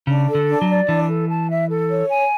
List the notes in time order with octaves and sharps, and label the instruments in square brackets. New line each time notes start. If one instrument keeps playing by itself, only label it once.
[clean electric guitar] C#3 [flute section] D4
[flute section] A4
[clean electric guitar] D3
[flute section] D4
[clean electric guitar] F#3
[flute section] D5
[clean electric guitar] E3 [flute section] D4
[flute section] A4
A5
E5
A4
C#5
G#5